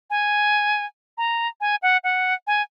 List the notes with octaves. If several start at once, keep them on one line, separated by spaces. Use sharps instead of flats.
G#5
A#5
G#5
F#5
F#5
G#5